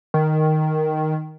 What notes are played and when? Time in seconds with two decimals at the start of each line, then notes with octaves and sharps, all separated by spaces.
0.14 D#3